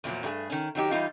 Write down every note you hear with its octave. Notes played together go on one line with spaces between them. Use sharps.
E2 A#2 F3 F#3
G2 A3 G4 G#4
D#3 C#4
D#3 F#3 D#4 G4
E3 G3 D#4 F4